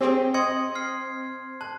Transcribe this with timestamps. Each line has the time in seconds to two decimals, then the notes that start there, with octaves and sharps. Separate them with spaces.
0.01 C4 G4 G#4 C#5
0.34 D#5 C6 D#6 G#6 C#7
0.75 F6 C7
1.61 A5 F#6